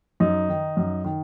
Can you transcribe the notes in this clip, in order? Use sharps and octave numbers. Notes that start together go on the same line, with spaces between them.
F#2 D#4
D#3
F#2
D#3